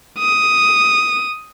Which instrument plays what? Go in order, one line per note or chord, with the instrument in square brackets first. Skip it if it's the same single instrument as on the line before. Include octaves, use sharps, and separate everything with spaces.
[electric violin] D#6